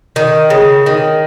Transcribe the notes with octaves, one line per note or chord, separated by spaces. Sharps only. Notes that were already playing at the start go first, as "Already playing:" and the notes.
D#3
C#3
D#3